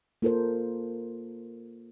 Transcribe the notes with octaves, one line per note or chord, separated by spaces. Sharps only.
A#3 F4 A4 A#4 C5